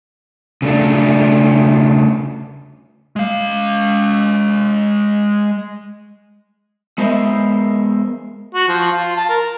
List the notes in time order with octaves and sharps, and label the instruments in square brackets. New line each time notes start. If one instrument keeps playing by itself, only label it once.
[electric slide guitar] C#3 A3 D4
[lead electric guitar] G#3 F5
[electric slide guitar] G#3 B3 A#4 C5 D#5 E5
[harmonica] F#4
F3
F4
A5
A#4